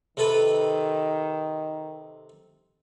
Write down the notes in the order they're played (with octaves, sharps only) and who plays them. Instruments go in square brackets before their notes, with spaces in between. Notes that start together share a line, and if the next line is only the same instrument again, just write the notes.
[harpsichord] C3 A4 B4 [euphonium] D#3